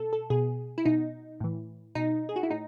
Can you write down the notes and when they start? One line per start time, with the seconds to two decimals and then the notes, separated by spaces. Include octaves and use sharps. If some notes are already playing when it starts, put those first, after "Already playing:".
Already playing: B2 A4
0.13 A4
0.30 B2 G#4
0.78 E4
0.85 B2 D#4
1.40 A2 E3
1.95 B2 D#4
2.29 G#4
2.36 F#4
2.43 E4
2.50 A2 D#4